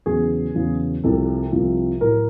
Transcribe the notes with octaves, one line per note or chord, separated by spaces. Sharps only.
E2 C#3 F#3 G#4
E2 C#3 F#3
C2 C3 F3 A4
C2 C3 F3
A2 F#3 A#4